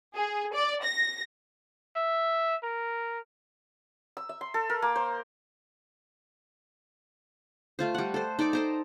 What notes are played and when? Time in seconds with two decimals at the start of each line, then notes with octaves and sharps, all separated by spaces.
0.15 G#4
0.53 D5
0.84 A#6
1.96 E5
2.63 A#4
4.17 E6
4.29 E5
4.41 C6
4.54 A4
4.70 A#4
4.82 A#3
4.96 C5
7.79 A3 F4 C5
7.94 G3 F#5
8.14 A4 C5
8.39 D#4 D5 G5 D6
8.53 A4 C5 A#5